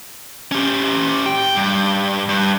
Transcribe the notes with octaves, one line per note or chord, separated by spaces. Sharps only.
C#4 G4
G5
G2
G2